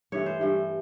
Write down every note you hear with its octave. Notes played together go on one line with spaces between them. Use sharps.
G2 E3 A3 C#5
C5
G2 E3 A3